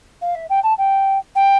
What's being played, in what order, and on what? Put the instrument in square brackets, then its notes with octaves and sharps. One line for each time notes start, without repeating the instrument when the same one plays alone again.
[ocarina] F5
E5
G5
A5
G5
G5